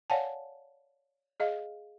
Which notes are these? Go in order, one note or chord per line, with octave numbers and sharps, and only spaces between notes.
C#5 D5 F5 F#5 G#5 A5
G#4 D#5 F5